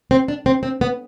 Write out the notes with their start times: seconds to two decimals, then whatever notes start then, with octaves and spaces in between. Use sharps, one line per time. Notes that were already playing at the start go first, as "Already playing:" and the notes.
0.11 C4
0.28 D4
0.46 C4
0.63 C4
0.81 B3